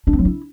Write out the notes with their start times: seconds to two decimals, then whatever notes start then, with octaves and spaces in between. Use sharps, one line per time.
0.07 D4
0.13 C4
0.19 F#3
0.25 E4